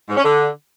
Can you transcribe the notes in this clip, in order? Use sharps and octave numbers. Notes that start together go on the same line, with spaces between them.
G#2
C#4
D3